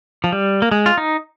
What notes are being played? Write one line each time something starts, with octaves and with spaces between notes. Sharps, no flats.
F3
G3
A#3
G#3
F4
D#4